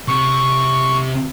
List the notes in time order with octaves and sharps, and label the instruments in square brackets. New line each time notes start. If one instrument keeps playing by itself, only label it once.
[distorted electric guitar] C3 [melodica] C#6